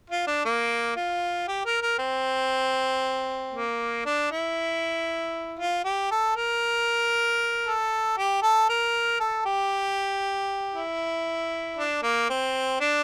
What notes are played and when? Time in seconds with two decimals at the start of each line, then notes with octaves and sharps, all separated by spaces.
0.10 F4
0.27 D4
0.45 A#3
0.97 F4
1.48 G4
1.66 A#4
1.82 A#4
1.99 C4
3.53 A#3
4.06 D4
4.31 E4
5.59 F4
5.85 G4
6.11 A4
6.37 A#4
7.66 A4
8.17 G4
8.42 A4
8.69 A#4
9.20 A4
9.46 G4
10.75 E4
11.77 D4
12.03 A#3
12.30 C4
12.80 D4